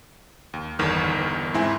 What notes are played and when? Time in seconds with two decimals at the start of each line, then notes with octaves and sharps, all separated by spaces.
0.53 D#2
0.79 G1 E2 D#3 F6
1.54 G#2 C4 E4 G#5